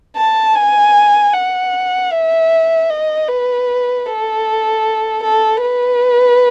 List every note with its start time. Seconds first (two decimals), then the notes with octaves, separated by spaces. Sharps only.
0.16 A5
0.55 G#5
1.33 F#5
2.11 E5
2.89 D#5
3.28 B4
4.06 A4
5.23 A4
5.62 B4